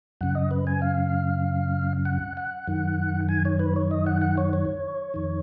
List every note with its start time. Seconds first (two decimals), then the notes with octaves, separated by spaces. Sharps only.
0.21 F#2 C#3 F#5
0.35 D#5
0.51 B4
0.67 G#5
0.82 F5
2.05 F#5
2.37 F#5
2.67 F#2 D#3
3.29 G#5
3.45 C#5
3.59 B4
3.76 C#5
3.91 D#5
4.06 F#5
4.22 F#5
4.38 C#5
4.53 C#5
5.14 F2 D#3